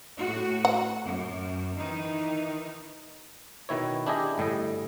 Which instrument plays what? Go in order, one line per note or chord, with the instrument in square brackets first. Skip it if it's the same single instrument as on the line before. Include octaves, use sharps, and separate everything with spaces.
[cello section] A2 F#4
[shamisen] F#5
[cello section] F#2
D#3 E3 D#4
[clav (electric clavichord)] B2 D#3 E4 C#5
D4 E4 G4 G#4 D#5
G1 A2 G3 D#5